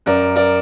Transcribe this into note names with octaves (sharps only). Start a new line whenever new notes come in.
F#2 A#4 D5
A#4 D5